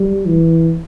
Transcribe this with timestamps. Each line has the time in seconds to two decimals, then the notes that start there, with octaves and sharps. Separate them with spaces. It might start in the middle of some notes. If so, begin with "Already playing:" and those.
Already playing: G3
0.26 E3